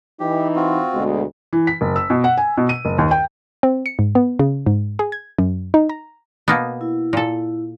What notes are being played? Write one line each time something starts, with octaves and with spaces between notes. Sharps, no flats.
E3 D#4 G4
C4 F4 F#4
D2 B2 G#3
E3
B6
F#1
E6
B2
F#5
G#5
B2
D#7
F#1
D#2
G5
C4
C#7
G#2
B3
C#3
G#2
G#4
G#6
F#2
D#4
A#5
B2 A#3 B3
E4
A#2 A4